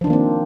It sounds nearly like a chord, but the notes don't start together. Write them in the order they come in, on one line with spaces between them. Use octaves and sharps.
F3 D4 D#3 A#3 C4